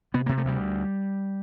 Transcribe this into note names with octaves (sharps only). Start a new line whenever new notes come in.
C3 B3
C3 A#3
A3
D2 G3